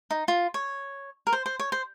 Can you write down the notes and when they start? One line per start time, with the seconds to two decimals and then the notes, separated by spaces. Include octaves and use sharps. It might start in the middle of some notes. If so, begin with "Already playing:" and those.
0.11 D#4
0.28 F4
0.54 C#5
1.27 A#4
1.33 C5
1.46 C5
1.59 C#5
1.72 C5